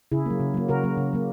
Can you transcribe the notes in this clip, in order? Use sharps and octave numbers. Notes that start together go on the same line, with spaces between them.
C#3 E4 G#4
F#3 A#3
C#3
F#3 A#3
C#3 F#4 A#4
F#3 A#3
C#3
F#3 A#3